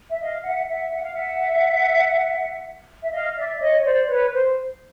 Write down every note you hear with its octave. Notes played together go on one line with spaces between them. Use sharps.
E5
D#5 F5
E5 F#5
E5 F#5
F#5
F5
E5 F#5
E5
D#5 F5
D5 E5
C#5 D#5
C#5
C5 D5
B4 C#5
C5